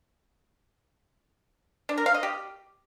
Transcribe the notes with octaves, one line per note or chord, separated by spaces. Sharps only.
D4
A#4
F5
D#5
G4